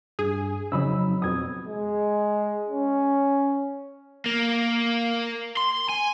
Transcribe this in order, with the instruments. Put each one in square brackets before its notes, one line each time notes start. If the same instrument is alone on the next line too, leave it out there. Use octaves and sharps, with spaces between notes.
[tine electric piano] G2 [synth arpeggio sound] G#4
[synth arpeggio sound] F2 C#3 D#4 [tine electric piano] F#3 B5 E6
[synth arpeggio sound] F2 B2 [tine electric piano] D#6 G#6
[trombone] G#3
C#4
[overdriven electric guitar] A#3
C6
G#5